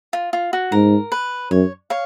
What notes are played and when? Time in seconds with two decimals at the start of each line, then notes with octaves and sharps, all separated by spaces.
0.13 F4
0.33 F4
0.53 F#4
0.72 G#2 A#4
1.12 B4
1.51 F#2 C#5
1.90 C#5 F5